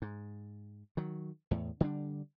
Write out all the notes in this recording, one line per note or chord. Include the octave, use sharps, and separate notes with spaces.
G#2
D#3 F#3
E2 A2
D3 G3 D4